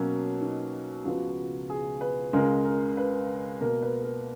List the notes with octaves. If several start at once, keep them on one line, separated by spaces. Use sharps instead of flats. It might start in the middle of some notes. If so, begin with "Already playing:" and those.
Already playing: B2 F#3 A#3 C#4
D#4
C#2 C#3 F3 B3 F#4
G#4
B4
C#2 C#3 G#3 A#4
A#4
B4
B2 A#3 A#4
B4
A#4